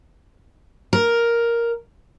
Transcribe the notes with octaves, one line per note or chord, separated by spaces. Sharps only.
A#4